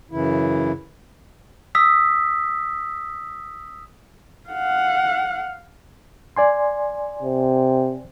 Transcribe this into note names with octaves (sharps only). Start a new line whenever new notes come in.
F#2 C#3 E3 E4
D#6 E6 B6
F5 F#5
D5 G#5 C6
C3